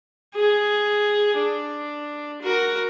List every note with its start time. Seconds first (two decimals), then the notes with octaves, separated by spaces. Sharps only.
0.35 G#4
1.37 D4
2.42 F#4 A#4